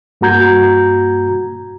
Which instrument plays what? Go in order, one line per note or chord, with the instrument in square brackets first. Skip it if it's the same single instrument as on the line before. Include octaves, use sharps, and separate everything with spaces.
[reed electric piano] G2 A#3 F#4 A#5 G6 G#6